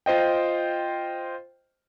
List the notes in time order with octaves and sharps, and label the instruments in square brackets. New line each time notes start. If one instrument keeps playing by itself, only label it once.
[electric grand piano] F4 C5 D#5 G5